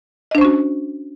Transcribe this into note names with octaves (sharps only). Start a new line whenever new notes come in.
C#4 D4 F#4 C5 D#5